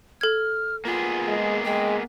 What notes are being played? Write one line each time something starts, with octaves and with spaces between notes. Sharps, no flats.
A4 F6 G#6
A#3 B3 F4 G#4
G#3
G#3 G5